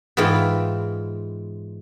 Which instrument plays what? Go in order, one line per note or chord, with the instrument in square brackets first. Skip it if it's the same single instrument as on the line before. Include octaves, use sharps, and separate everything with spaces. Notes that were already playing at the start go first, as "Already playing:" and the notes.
[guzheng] G#2 E3 B3 F4 G5